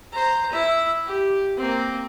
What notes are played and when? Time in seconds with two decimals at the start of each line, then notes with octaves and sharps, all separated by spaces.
0.12 C5 A#5
0.52 E4 E5
1.07 G4
1.57 A#3 C4